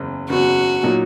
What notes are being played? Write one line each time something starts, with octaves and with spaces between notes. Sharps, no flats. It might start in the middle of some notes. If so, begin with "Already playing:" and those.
Already playing: F#1 E2 C#3
F#1 E2 C#3 F#4
A#2 F#3 A#3 D#4